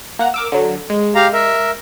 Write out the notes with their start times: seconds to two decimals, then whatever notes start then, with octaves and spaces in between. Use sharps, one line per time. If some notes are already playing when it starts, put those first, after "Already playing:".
0.19 A#3 F#5 A#5
0.34 A#4 D6 E6
0.52 D3 F#3
0.90 G#3
1.15 G4 F5 A#5
1.33 A#4 E5